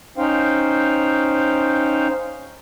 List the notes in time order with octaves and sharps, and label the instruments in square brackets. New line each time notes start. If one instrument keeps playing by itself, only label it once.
[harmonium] C#4 D#4 C5 F5 G5